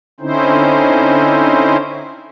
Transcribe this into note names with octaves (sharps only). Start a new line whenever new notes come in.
D3 C4 C#4 D#4 E4 C5